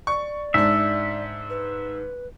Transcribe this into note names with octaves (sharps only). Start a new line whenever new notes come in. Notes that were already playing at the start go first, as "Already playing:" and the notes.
D5 C#6
G#2 D4 E5
B4